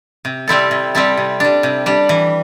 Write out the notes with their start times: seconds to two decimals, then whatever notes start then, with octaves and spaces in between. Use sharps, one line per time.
0.25 C3
0.48 G3 C4 E4 A4
0.71 C3
0.95 G3 C4 E4 A4
1.17 C3
1.40 G3 D4
1.63 C3
1.86 G3 D4
2.09 E3